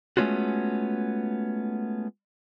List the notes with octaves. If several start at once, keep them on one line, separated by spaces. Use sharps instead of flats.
G#3 A3 B3 C#4 F4 F#4